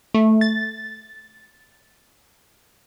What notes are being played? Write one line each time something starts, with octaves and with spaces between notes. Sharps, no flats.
A3
A6